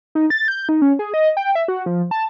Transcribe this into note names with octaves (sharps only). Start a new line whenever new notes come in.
D#4
A6
G6
D#4
C#4
G#4
D#5
G5
E5
F#4
F3
A5